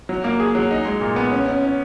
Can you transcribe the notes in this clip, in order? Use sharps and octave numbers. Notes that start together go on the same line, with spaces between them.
F#3
A#3
G#4
F#3
D#4
G#3
A#2
B3
C#4
C#4
C#4